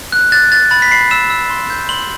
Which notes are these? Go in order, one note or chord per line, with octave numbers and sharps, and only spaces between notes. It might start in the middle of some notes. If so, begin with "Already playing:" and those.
F#6
F#6 A6
F#6 A6
B5 A6
B6
B5 C7
E6 E7
E6
C6
G6
C6 F#7